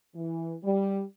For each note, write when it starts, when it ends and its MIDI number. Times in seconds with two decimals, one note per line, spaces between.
0.15 0.55 52
0.64 1.03 55